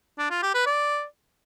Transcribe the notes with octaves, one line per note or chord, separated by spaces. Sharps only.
D4
F4
G4
B4
D5